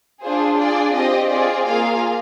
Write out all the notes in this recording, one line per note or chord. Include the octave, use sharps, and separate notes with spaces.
D4 F4 G#4 C5
D4 F4 G#4 D5
C4 G4 D#5
C4 F4 G#4 D5
A#3 F4 G#4 F5